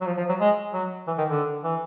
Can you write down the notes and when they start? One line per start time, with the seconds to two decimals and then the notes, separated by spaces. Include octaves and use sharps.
0.01 F#3
0.06 F3
0.17 F3
0.29 F#3
0.40 G#3
0.73 F#3
1.07 E3
1.18 D#3
1.29 D3
1.64 E3